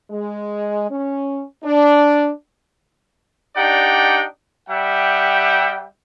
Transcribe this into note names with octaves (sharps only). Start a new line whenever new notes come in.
G#3
C#4
D4
D4 D#4 G4 D5 F#5 G5
G3 G4 E5 F#5 G5